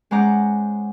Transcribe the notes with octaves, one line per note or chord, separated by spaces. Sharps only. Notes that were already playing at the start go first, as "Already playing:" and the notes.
G#3 C#4 C5 F#5 A#5 D6